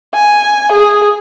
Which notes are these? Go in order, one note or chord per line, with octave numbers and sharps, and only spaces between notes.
G#5
G#4